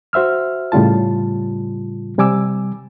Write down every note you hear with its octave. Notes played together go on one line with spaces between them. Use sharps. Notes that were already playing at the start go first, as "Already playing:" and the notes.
F#4 C5 E5 E6 F6
A2 C#3 G3 F4 A5
C3 G3 G#5 D6 E6